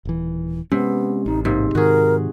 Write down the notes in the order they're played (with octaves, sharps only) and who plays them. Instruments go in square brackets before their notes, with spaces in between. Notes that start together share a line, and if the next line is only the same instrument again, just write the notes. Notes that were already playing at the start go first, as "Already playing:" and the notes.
[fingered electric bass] D#1 E3
[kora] C3 [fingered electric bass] G#3 C#4 [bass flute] B3
[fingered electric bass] A1 [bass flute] D#4
[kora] G#2 C3 [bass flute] A#3
[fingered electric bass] G#2 D#3 [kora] F#4 G#4 [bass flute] A#4